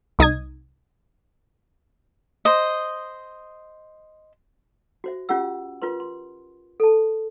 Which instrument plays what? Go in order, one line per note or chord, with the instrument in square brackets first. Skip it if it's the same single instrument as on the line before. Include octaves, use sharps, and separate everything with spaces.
[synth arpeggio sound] C2 D#4 D#6 G#6
[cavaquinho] C5 D#5
[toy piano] F#4 C5 E5
C#4 F4 G4 F#5 E6
F4 A#4 B4 C6
C6
A4 A5